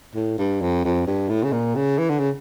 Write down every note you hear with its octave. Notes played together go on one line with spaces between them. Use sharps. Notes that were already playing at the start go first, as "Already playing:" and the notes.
A2
G2
F2
F2
G2
A2
C#3
A#2
C#3
E3
D3
C#3